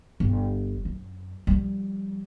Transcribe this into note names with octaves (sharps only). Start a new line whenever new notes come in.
G1
F#2
F3 G3